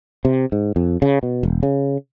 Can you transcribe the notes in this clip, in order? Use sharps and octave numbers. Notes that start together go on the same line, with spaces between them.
C3
G#2
F2
C#3
B2
E1
C#3